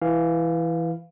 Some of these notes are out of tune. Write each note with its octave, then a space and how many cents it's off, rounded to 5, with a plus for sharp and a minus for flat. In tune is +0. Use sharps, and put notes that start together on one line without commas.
E3 +0 F5 +0